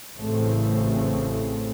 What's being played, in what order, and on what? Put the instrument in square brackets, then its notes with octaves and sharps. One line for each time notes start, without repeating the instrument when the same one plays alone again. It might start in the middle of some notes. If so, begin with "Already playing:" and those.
[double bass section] A1 A2 C#3 A3 C4